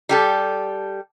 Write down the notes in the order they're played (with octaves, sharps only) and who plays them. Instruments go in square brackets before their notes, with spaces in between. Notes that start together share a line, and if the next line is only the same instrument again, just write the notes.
[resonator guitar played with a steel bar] G3 G4 A4